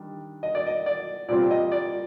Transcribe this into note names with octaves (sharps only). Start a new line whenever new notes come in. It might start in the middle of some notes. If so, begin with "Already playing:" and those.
Already playing: D#3 G3 D4
D#5
D5
D#5
D5
A#2 G3 C4 F4 D5
D#5
D5